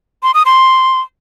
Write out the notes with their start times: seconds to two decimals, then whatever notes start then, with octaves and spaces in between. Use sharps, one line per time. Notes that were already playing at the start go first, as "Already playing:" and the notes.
0.23 C6
0.34 D#6
0.46 C6